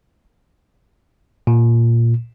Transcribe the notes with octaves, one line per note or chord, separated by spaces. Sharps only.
A#2